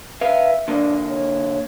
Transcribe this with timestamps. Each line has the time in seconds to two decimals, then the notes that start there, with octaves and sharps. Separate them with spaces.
0.21 B4 E5 F5
0.68 D3 A#3 D4
1.09 C#5